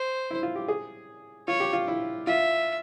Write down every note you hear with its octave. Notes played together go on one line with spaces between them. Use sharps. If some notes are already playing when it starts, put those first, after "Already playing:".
Already playing: C5
E4
F4
G4
G#4
F4 C#5
G4
F4
E4
F4 E5